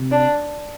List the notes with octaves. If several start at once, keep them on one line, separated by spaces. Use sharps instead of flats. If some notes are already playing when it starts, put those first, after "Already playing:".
Already playing: C3
D4